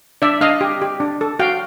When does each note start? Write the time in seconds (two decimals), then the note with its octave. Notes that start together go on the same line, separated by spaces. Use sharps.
0.22 D4 D5 E5
0.41 D4 D#5 F5
0.61 G4
0.82 G4
1.00 D4
1.21 A4
1.39 F#4 F5 G5